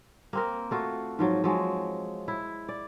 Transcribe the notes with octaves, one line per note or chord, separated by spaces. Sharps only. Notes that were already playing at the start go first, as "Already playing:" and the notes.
A#3 C4 A#4
A3 F4 F#4
G#2 F3 F#3
F3 F#3 G#3
E4
D5